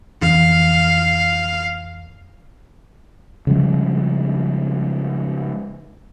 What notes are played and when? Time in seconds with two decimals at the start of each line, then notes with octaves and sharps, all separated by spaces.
0.22 F2 E3 F5
3.47 C#3 F3 G3 G#3